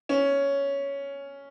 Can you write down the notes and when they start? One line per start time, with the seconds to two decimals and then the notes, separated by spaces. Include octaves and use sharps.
0.09 C#4